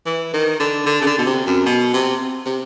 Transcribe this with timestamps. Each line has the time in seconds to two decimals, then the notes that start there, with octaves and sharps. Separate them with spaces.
0.06 E3
0.33 D#3
0.59 D3
0.86 D3
1.01 C#3
1.06 D3
1.18 B2
1.26 C3
1.46 F#2
1.66 B2
1.93 C3
2.46 C3